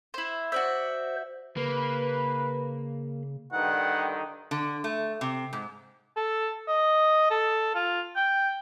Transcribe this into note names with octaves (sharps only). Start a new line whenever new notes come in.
E4 C5
F#4 C5 D5 E5
C#3 A#3 B4
G2 D3 D#3 F#5
D3
A3
C3
G#2
A4
D#5
A4
F4
G5